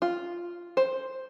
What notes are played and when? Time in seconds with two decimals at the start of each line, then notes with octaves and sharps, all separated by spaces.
0.02 F4
0.77 C5